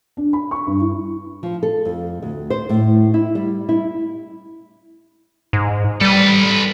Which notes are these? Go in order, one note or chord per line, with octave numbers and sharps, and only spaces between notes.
D4
B5
C#6
G2
E4
F3
A4
F2
D2
C5
A2
E4
G3
E4
G#2
G3 A4 B4